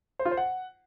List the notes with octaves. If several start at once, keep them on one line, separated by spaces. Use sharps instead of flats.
C5
F4
C5
F#5